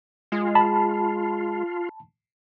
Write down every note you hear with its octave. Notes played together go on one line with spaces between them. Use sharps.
G#3 F4
A5 B5